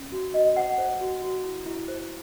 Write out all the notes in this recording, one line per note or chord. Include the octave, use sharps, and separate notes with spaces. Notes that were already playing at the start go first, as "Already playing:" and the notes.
Already playing: C#4
F#4
F#4 D#5
C5 F#5
C5
F#4
F#4
E4
E4
C5